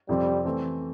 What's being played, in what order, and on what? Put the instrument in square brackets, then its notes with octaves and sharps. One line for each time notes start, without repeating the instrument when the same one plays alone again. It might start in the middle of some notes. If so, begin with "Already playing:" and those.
[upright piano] F2 C3 F3 C4 [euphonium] G3
[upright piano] E3 A3 C4